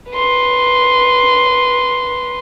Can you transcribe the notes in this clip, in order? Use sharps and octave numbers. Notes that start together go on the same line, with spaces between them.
B4 C6